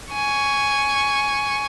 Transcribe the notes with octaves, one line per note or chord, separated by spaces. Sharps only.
G#5 C#6